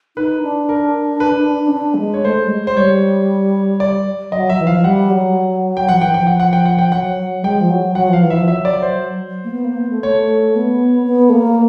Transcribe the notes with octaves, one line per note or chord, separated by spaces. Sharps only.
D#4 B4
D4
A#4
B4
C#4
D4
G3
G#3
C#5
A3 C5
G3
G#3
C5
G3 C#5
D5
F#3 D#5
E5
E3
F3 F5
G3 F#5
F#3
G5
F3 F#5
E3 G5
F3 G5
F#5
F#5
G5
F#5
G5
F#3 F#5
G#3 G5
F3
F#3
F#3 F#5
F3 F5
E3
F3 E5
F#3 E5
D5
C5
A#3
B3
A#3
B3
A3
A3 C#5
B3
B3
A3
A#3